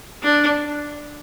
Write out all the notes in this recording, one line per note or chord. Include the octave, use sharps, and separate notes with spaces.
D4